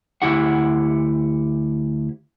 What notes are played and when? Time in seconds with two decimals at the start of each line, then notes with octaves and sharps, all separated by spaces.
0.22 D2 E4 G4 F#5